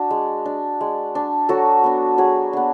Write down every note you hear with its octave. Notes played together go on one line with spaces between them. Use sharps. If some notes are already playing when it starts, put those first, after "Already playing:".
Already playing: D4 F#4
G#3
D4
G#3
D4
F#3 F#4 A4
B3 D4
F#3 G#4
B3 D4